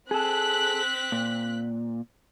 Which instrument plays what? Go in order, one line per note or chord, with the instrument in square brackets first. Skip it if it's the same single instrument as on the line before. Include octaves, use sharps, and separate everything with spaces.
[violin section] C4 F#6 B6 [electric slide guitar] G#4 A4
[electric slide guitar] A#2